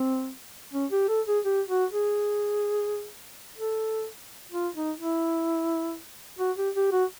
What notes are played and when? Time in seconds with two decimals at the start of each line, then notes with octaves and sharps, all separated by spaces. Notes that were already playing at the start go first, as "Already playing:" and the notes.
Already playing: C4
0.73 C#4
0.91 G4
1.09 A4
1.27 G#4
1.45 G4
1.69 F#4
1.92 G#4
3.57 A4
4.52 F4
4.75 D#4
4.98 E4
6.39 F#4
6.57 G4
6.75 G4
6.92 F#4